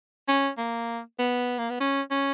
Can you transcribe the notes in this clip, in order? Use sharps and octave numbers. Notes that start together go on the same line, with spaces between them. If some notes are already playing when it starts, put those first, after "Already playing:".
C#4
A#3
B3
A#3
B3
C#4
C#4